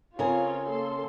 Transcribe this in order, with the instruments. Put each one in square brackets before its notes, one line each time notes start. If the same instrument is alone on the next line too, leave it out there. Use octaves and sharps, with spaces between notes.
[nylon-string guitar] C#3 A#4 G#5 [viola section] C4 F4 C#5
[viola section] A#3 A4 C6